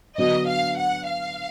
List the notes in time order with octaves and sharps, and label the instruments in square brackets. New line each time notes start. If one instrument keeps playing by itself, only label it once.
[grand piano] D3 F#3 B3 D4 F#4 [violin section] D#5
[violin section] F5
F#5
F5